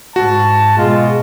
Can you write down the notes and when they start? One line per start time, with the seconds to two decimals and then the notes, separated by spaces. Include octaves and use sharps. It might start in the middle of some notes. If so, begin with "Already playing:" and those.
0.16 G#2 F#4 A5
0.78 B2 G#3 F4